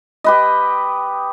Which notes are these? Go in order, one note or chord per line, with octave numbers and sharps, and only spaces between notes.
G4 B4 D#5